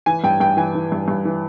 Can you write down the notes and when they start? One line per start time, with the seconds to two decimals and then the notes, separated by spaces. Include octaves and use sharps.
0.06 E3 G#5
0.24 G2 G5
0.40 G2 G5
0.57 E3 G#5
0.75 E3
0.92 G2
1.08 G2
1.25 E3